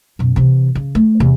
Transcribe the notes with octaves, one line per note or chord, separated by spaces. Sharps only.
F#2 B2
C3 E3
C#3
A3
E2 C3